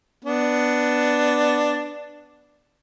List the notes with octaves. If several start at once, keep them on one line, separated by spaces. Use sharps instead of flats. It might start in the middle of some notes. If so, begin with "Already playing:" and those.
B3 D4